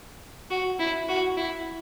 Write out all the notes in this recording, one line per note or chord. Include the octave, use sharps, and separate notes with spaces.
F#4
E4
F#4
E4